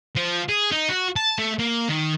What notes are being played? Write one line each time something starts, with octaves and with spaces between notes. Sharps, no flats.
F3
G#4
D#4
F#4
A5
A3
A#3
D#3